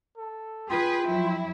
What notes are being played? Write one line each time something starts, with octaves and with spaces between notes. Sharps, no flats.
A4
F4 G#4 B4 G5
F2 F#3 E4